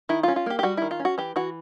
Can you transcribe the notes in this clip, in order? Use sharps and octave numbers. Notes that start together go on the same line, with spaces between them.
D#3 E4
F4
C#4
F4
A#3 G4
G4
G3 F#4
D#3 E4
F4
C#4
F#4
E3 G4
E3 F#4